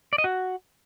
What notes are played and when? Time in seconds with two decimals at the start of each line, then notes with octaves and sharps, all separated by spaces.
0.13 D5
0.18 D#5
0.24 F#4